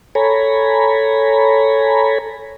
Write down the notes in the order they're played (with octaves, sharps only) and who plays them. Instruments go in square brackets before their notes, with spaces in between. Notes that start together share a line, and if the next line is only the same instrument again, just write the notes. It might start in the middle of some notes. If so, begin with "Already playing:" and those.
[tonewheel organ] A4 C#5 G#5 A#5 B5